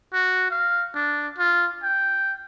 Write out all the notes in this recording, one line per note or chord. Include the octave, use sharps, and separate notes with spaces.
F#4
F5
D4
F4
G5